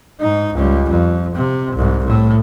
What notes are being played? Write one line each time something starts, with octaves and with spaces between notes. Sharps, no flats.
G#2 D#4
C#2 G3
F2
C3
C2 G#2
A2